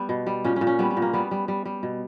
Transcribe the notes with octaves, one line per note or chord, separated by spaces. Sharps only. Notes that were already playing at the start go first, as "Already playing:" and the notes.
Already playing: G3 B3
B2
G3
A#2 C#4
C#4
A#2
C#4
G3 B3
B3
A#2
A#3
G3 B3
G3
G3
G3
B2